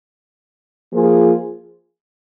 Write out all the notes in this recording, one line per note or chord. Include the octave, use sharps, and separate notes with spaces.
F3 A#3 F4 G#4